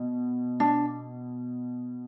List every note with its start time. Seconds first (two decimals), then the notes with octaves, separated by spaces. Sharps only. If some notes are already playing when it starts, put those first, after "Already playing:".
Already playing: B2
0.60 D4